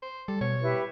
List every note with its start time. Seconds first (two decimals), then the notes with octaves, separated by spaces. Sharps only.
0.02 C5
0.28 G3 A4
0.41 B2 C#5
0.62 E4 G4 B4